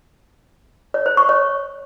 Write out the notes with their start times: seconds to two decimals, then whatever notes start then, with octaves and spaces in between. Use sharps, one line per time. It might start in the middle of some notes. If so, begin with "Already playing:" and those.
0.94 C#5
1.06 C5
1.17 C#6
1.29 C#5